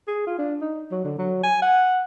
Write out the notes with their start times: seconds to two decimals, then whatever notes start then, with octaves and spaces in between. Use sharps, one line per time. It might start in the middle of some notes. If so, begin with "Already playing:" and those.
0.08 G#4
0.27 F4
0.39 D4
0.61 D#4
0.91 F#3
1.04 D3
1.18 F#3
1.44 G#5
1.62 F#5